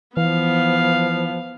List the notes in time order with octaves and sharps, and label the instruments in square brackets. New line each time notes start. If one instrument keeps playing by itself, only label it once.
[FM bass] E3 [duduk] F3 [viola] B3 [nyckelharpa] F5